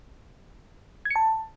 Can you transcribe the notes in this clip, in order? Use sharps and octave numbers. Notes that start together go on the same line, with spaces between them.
G#6
C#7
A5